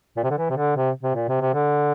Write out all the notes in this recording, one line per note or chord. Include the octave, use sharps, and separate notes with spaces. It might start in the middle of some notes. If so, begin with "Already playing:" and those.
A#2
C3
D3
E3
C3
D3
C3
C3
A#2
C3
C3
D3